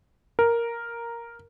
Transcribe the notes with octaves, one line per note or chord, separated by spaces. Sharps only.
A#4